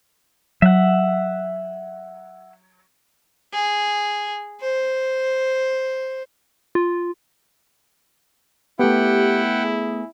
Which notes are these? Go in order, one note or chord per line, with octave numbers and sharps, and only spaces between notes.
F#3 E5 F#5
G#4
C5
F4
A3 B3 E4 G4 F#5 G5
G#4